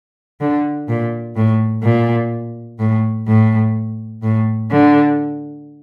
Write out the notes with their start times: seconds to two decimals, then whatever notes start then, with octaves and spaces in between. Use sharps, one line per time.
0.41 D3
0.88 A#2
1.36 A2
1.84 A#2
2.80 A2
3.27 A2
4.23 A2
4.71 D3